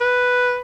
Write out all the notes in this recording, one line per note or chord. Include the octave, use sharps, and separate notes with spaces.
B4